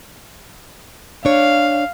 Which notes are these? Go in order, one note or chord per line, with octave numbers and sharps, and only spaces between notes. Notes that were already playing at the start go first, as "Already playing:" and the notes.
D4 C#5 F5